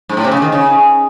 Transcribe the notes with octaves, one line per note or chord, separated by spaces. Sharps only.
G#2
A2
C3
C#3
D#3
C#3